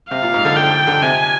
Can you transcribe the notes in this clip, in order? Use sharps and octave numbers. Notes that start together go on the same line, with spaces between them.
C3 F5
A#2
G#2
D3
D3 G5
D3
C3 G#5